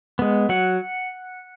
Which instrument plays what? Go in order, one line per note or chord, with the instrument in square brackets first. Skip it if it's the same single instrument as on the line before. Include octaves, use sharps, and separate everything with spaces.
[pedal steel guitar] G#3 B3
F#3 F#5